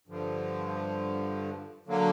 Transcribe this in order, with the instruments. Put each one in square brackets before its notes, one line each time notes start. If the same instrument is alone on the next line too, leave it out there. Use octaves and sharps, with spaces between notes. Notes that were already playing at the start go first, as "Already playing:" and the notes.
[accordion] G2 D3 F3
D3 F#3 A#3